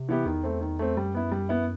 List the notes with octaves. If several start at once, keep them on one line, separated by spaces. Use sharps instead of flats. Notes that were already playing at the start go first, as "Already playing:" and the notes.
Already playing: C3
E3 B3 E4 G4
E2 D#3
A3 C4
D#3
A3 C4
F#2 G3
B3 E4
G3
B3 E4